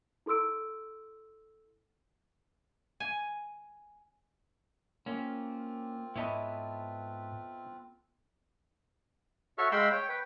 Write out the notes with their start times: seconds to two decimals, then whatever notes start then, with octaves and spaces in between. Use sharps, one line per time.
0.26 E4 A4 C6 E6 D7
3.00 G#5
5.06 A#3 C4 C#4 F4
6.16 G#2 B3 E4 A4 B4 C#5 D#5
9.58 F#4 A4 C#5 E5 C#6 F6
9.72 G#3 F5 G5 B5 C6 E6
9.92 C#5 G5
10.09 B4 G5